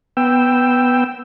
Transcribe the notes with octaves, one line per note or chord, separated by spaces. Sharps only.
B3 G5 E6